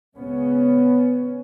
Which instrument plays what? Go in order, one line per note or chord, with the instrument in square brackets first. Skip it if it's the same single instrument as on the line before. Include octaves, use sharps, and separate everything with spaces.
[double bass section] C#2 C#3 B3 C#4